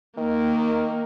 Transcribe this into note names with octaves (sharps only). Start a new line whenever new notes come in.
D#3 A#3